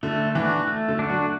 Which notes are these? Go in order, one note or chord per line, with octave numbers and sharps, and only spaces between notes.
D3 A3
E3 D4 F#4
A3
D3
D4 F#4
F#3
A3